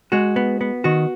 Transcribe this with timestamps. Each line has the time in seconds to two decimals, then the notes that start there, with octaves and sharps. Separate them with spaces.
0.12 G#3 F#4
0.36 B3
0.61 B3
0.84 D#3 F#4